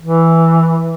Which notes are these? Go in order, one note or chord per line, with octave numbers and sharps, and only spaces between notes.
E3